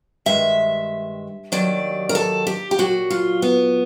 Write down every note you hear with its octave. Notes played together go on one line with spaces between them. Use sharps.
G2 D#3 G#3 E5
D#2 D#3 F#3 D5
A#4
A4
G4
G4
A#2 F#3 F#4
F4
B3